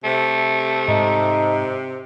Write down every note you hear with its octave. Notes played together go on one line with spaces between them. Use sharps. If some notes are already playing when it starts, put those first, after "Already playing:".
C3 A3
G#2 D#4